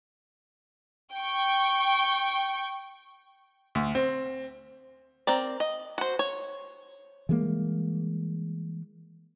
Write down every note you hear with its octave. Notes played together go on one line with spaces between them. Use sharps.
G5 C#6
D2
C4
C4 A#4 D5
D#5
F#4 C5
C#5
E3 G3 G#3 A#3